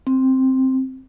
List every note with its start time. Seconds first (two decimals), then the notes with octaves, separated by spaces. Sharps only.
0.07 C4